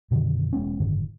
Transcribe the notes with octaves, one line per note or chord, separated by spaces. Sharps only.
F#2 B2 D3 D#3
E1 G#3 B3 C#4
F#1 G#2 D3 D#3